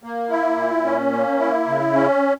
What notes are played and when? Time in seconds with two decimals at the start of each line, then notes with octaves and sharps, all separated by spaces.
0.03 A#3
0.30 E4
0.57 A#2
0.85 C#4
1.12 A#3
1.40 E4
1.68 C#3
1.94 C#4